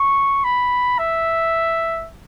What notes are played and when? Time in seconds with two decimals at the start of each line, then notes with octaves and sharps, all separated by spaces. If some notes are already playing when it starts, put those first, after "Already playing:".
Already playing: C#6
0.44 B5
0.99 E5